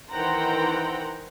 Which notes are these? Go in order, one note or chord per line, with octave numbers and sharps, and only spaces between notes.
D#3 E3 C5 F#5 G5 A#5